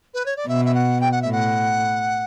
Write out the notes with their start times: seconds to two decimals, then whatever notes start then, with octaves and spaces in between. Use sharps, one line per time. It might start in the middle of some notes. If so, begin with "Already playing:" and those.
0.14 B4
0.25 C#5
0.36 D5
0.47 B2 E5
0.65 E5
0.74 F#5
1.00 G5
1.11 F#5
1.21 A2 E5
1.32 F#5